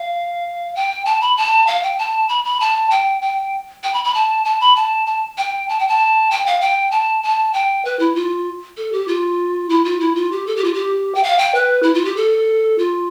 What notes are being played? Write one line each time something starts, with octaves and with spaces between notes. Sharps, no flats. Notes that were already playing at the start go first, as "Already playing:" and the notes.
Already playing: F5
G5
A5
B5
A5
F5
G5
A5
B5
B5
A5
G5
G5
G5
B5
B5
A5
A5
B5
A5
A5
G5
A5
G5
A5
G5
F5
G5
A5
A5
G5
B4
E4
F4
A4
G4
F4
E4
F4
E4
F4
G4
A4
G4
F4
G4
G5
F5
G5
B4
E4
F4
G4
A4
F4